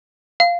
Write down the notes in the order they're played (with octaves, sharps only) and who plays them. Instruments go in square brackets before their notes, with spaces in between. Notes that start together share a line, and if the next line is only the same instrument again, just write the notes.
[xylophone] F5